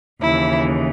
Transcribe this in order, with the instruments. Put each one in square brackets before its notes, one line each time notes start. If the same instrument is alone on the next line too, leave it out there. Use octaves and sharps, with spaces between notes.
[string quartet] D#2 C#3 E3 E4